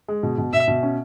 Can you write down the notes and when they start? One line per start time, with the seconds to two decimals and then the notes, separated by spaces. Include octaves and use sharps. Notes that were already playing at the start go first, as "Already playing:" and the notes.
0.08 G#3
0.23 B2
0.38 B2
0.53 B2 E5
0.68 B2
0.83 C#4